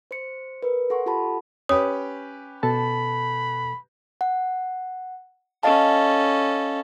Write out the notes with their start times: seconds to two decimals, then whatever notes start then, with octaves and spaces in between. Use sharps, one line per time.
0.11 C5 C6 C#7
0.63 A#4 B4
0.90 A4 F#5 C6 C#6
1.06 F4 G4 A4 F#5 A5 B5
1.69 C#4 G4 B4 C#5 D#6
2.63 B2 A4 A5 B5
4.21 F#5
5.63 C#4 A4 D#5 F5 A5